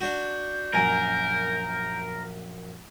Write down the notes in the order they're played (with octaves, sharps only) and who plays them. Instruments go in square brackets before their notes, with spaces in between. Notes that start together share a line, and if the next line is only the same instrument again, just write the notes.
[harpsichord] D4 F#4 [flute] G6
[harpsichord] A#1 F#2 [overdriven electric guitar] A#4 [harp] G#5 A#6